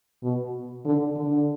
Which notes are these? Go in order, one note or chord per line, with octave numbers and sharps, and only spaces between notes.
B2
D3
D3